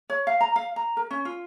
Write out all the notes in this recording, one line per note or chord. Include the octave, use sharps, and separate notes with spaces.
C#5
F5
A#5
F5
A#5
A#4
C#4
F4